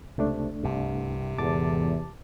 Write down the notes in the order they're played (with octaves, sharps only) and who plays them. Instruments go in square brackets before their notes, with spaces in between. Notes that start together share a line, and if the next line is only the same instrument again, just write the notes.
[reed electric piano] C#2 A3 D4 [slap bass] C3
[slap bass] C2 G2 [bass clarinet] C3
[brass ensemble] E2 [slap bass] G#2 D3 [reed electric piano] A5 D6 A6